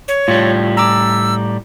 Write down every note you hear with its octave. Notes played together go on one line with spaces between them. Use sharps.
C#5
A2 G3 F4
A#5 D6 E6